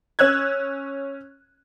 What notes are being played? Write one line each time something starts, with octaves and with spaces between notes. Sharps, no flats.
C#4 E6 F#6 G#6